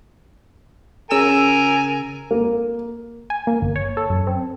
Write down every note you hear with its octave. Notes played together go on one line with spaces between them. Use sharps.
C#3 A#4 G#5 E6 E7
A#3
G#5
A#3
G1
C#5
A4
F#2
C4